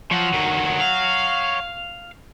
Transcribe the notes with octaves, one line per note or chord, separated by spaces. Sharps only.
F3 C#5 F#5
D2 D#3
F5